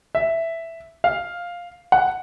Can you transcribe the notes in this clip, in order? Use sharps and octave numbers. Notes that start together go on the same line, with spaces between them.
E5
F5
F#5